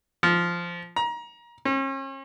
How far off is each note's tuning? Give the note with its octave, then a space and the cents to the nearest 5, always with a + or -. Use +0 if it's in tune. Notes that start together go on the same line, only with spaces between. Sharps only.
F3 -10
A#5 +25
C#4 -40